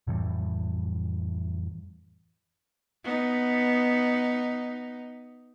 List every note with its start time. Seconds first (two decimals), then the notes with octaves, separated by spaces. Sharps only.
0.07 F2 A2 E3 G3
3.04 B3 D#4